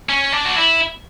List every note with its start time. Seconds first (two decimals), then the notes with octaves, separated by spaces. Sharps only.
0.09 C#4
0.32 D4
0.45 F#4
0.56 E4